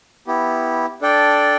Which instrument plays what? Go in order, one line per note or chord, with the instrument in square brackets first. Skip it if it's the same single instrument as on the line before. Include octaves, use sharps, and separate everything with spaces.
[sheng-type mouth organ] B3 E4 G4
D4 A4 D5 G5